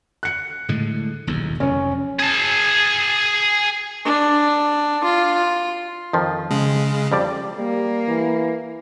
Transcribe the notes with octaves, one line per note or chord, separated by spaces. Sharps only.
F#6 C#7
A2 D3 G#3
D#1 B1 E2
F1 C#4
G#4 A5
D4
F4
F2 D#3 F3
C#3 G#3
F2 G3 D5
G3 A#3
E3